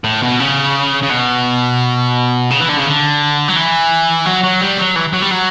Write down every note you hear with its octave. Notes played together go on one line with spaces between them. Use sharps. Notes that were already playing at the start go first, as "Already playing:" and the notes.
A2
B2
C#3
C#3
B2
C#3
E3
D3
C#3
D3
F#3
E3
F#3
F#3
G3
F#3
E3
F#3
G3
F#3